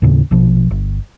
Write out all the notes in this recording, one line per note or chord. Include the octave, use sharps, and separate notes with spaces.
D#2 A2 C#3
A#1 B2 F3
G1